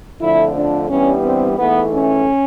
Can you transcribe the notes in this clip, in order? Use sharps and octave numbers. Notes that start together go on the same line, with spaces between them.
F2 D3 F3 A3 E4
D4
G2 E3 G3 B3 C#4
C4
G#2 E3 A3 B3
C#4